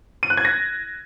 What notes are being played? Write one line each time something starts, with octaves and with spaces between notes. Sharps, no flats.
D#7
F#6
G#6
A#6